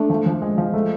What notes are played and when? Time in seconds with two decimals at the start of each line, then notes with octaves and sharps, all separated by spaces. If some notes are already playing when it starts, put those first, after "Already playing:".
Already playing: A3 D4
0.10 F3
0.26 F3
0.42 G#3
0.58 F3
0.74 A3